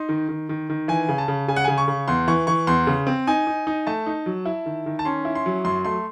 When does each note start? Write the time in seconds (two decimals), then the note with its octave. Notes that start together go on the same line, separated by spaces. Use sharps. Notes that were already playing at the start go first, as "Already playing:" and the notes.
Already playing: D#4 C6
0.09 D#3
0.29 D#3
0.49 D#3
0.69 D#3
0.88 E3 G#5
1.09 C#3
1.18 A5
1.28 C#3
1.48 C#3 G#5
1.56 F#5
1.64 C#3 G#5
1.78 C#6
1.88 C#3
2.08 E2 C6
2.28 E3 C#6
2.47 E3 C#6
2.67 E2 C6
2.87 C#3
3.07 C4
3.27 D#4 G#5
3.47 D#4
3.67 D#4
3.87 A3 A5
4.06 D#4
4.26 F#3
4.46 E4
4.66 D#3
4.86 D#3
4.99 A5
5.05 C#4 C6
5.25 E4
5.35 C6
5.46 F#3
5.65 F#2 C6
5.85 A3 C6